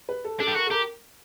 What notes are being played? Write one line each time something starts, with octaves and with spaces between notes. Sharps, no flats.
B4
A4
D4 A4
G4
F#4 A#4
A4
G4 A#4